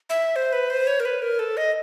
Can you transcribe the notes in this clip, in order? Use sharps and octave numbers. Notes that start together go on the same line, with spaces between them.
E5
C5
B4
C5
C#5
A#4
B4
A#4
A4
D#5